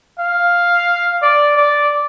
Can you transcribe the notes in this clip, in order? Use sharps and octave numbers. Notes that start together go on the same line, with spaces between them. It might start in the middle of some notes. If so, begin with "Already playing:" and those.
F5
D5
D5